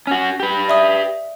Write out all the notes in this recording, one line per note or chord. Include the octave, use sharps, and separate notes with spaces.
C#4 F#4
G4 B4
D5 E5 D#6